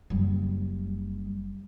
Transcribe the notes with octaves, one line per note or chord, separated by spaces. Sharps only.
F#1 G3